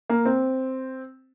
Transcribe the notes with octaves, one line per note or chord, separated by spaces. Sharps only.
A#3
C4